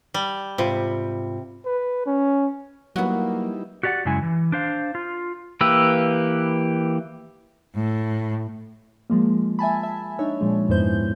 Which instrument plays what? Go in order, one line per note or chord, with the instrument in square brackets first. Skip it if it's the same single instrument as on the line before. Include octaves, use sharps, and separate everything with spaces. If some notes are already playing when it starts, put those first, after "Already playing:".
[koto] G3
[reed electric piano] G#2 F4 B5 [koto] C3
[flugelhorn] B4
C#4
[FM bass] F#3 [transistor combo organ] G3 D#4 E4 [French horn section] A#3 [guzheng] B3 F#4
[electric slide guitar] F#4 G4 D5 E5 F#5
F#2 C#3 G#3 E4 G#5
E3
D4 C5 F5
F4
[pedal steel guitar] E3 A#3 G4 B4 E6
[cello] A2
[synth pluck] F3 G#3 A#3
E5 G#5 A5 B5
E5
D4 D#4 C#5 E5
A#2 F3 G#3
F2 G#2 B3 E4 C5 G6